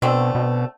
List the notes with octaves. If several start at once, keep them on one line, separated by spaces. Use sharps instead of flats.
B2 D3 A3 C4
B2